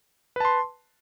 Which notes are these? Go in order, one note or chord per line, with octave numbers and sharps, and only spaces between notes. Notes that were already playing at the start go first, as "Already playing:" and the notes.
B4 A5 C6